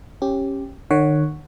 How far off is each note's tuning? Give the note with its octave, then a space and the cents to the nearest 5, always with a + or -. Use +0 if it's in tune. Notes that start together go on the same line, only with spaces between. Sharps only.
C#4 -20 G4 +0
D#3 -40 C#5 +0 F#5 +0